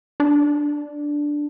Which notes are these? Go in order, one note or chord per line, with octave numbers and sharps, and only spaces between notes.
D4